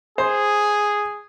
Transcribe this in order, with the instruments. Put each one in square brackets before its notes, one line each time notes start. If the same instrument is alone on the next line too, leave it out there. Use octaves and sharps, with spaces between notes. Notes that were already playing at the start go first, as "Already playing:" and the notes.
[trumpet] G#4 [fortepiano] C5